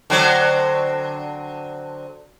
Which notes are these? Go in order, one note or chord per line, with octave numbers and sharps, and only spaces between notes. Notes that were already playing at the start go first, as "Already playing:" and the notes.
D3 F#3 C4